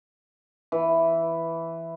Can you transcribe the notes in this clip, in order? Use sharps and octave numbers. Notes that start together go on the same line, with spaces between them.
E3